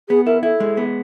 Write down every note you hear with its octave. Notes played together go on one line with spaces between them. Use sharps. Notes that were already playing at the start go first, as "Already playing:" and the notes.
B3 G#4
E4 A#4
E4 A4
G#3
B3